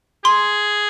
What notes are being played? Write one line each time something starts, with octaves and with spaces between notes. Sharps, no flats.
G#4 C6